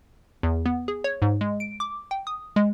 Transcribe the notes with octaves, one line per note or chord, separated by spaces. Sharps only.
E2
B3
G#4
C#5
G#2
G#3
D7
D6
G5
D#6
G#3